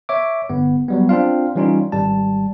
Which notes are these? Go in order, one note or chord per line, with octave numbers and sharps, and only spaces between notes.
C#5 E5 D6
G1 B3
F#3 G3 B3
C4 D4 F4 F5
E3 G3 C#4 D#4 F4
G#1 G3 A5